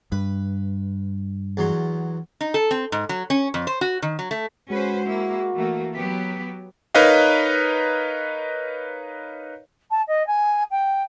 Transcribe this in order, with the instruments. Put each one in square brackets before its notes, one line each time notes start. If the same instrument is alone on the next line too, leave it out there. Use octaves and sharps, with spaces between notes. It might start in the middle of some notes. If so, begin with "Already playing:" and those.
[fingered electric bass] G2 [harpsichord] B4
[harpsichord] E2 F#3 C6
[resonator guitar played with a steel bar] D#4
A4
C4
G#2
F#3
C#4
F2
C5
F#4
D#3
F#3
A3
[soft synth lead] G#3 [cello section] C#4 B4 C5 [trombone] F#4
[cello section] A#3 E4
E3 A3 A#3
[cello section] F#3 B3 G4 [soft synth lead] B6
[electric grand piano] D#4 A#4 B4 C#5 D#5 F5
[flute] A5
D#5
G#5
G5